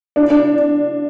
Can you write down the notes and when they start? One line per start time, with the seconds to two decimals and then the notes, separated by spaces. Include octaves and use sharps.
0.16 D4
0.30 D4